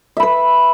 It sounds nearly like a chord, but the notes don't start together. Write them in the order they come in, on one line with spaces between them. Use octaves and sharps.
E5 B5 B4